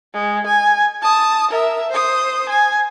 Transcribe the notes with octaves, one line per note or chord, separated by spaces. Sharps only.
G#3
G#5
A5 D#6
A#4 E5
C5 D#6
G#5